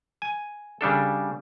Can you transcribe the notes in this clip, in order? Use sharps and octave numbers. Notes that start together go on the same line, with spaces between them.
G#5
C#3 G3 D4 A4